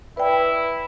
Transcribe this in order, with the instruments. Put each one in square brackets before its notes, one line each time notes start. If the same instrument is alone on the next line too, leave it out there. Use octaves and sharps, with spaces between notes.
[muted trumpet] E4 [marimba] B4 D5 G5